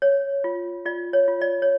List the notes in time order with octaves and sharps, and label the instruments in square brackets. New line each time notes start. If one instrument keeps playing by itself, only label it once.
[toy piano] C#5
F4
F4 D5
C#5
F4
D5
C#5